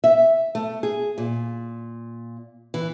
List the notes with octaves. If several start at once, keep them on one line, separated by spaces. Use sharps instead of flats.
E5
A3
G#4
A#2
E3